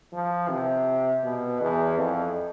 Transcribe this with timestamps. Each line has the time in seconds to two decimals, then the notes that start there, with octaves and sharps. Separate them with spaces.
0.13 F3
0.49 C3
1.23 B2
1.61 E2
1.97 F2